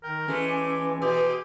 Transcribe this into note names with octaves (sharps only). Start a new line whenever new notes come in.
D#3 A#4 G5
E3 G#3 A3 C#4 G#5
D6
B2 G4 D#6